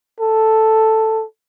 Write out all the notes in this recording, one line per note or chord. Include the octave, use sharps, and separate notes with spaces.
A4